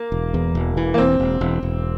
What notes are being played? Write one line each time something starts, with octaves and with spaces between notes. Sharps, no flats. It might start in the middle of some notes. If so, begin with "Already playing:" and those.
Already playing: A#3
E1
E2
E1
E3
A#3
E1 C4
E1
E1
E1